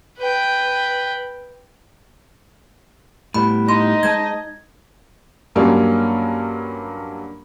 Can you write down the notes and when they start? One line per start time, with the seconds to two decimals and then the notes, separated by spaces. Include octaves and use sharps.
0.18 B4 G5
3.34 A2 G3 B3 B5
3.69 D#4 D#5 C6
4.03 G#3 C5 A5 G#6
5.55 G2 F#3 G3 A#3 C#4 F4